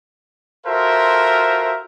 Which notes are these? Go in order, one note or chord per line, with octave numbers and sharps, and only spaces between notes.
F4 F#4 A4 A#4 C5 E5